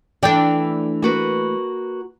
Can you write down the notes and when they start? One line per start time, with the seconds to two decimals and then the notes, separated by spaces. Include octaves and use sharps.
0.23 E3 A3 D4 D5 G5
1.02 A#3 F#4 B4